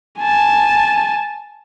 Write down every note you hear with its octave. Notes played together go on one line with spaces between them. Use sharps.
G#5 A5